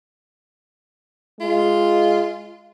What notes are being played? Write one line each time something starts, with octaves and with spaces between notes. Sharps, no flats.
G#3 F4